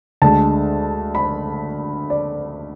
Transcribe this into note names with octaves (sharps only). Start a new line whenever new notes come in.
D2 D3 G#3 A5
B5
D5